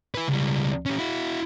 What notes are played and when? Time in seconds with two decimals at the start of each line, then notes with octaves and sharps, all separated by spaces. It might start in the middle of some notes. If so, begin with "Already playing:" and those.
0.15 E4 B4
0.28 C#2 G3
0.86 C#4 G4
0.98 E4 F#4